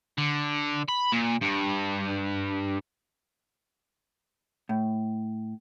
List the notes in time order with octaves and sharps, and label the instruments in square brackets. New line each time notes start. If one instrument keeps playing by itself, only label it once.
[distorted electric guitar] D3
B5
A#2
G2
[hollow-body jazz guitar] A2